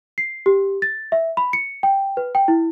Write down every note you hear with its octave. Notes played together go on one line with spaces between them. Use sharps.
C7
G4
A6
E5
B5
C#7
G5
B4
G5
E4